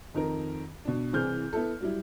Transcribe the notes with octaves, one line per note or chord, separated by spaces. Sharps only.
F2 D#3 A#4
B2 D4
C2 E3 C4 G#4 F6 G6
B3 E4 A4
F#3 G3 E4